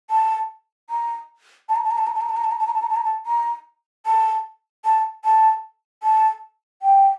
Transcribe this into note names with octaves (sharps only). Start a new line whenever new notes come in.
A5
A#5
A5
A#5
A5
A#5
A5
A#5
A5
A#5
A5
A#5
A5
A#5
A5
A#5
A5
A#5
A5
A#5
A5
A#5
A5
A5
A5
A5
G5